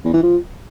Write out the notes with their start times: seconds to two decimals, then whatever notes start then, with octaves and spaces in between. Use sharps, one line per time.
0.04 E2
0.13 E3
0.22 F3